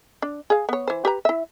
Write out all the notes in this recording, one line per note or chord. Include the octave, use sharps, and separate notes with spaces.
D4
G#4 F5
B3 C#5
E3 C5
G4 B4 A#5
E4 E5